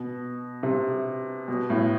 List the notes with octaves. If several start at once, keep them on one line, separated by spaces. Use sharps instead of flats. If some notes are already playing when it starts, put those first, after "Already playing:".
Already playing: B2
C3
B2
A2